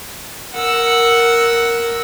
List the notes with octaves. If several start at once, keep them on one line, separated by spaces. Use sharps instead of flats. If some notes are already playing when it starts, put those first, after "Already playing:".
A#4 F#5 E6